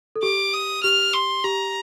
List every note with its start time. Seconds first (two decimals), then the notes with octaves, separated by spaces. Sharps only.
0.16 A4
0.22 G4 D6
0.53 D#6
0.83 G4 F6
1.14 C6
1.44 G4 A#5